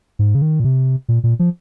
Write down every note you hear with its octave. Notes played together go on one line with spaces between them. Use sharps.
G#2
C#3
D#3
A#2
C3
A#2
A#2
F3